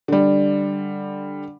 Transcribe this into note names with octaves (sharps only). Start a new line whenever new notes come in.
D3 G3